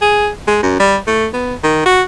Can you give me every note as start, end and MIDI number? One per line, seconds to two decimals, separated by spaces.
0.02 0.29 68
0.47 0.60 56
0.63 0.76 42
0.80 0.97 55
1.07 1.27 57
1.33 1.55 59
1.63 1.82 51
1.86 2.03 66